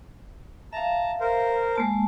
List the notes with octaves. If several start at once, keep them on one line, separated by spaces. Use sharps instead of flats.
E5 F5 A5 A#5
A#4 C5
G#3 A#3 A5